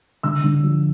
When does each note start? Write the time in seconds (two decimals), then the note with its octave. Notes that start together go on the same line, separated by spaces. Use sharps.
0.23 D3 E6
0.44 D3
0.63 F3